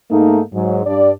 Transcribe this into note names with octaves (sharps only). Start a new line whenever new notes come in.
G#2 A3 A#3 D#4
G#2 F#3
G2 D5